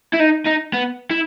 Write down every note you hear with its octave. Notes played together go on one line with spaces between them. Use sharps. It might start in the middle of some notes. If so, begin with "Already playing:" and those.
E4
D#4
D#4
B3
E4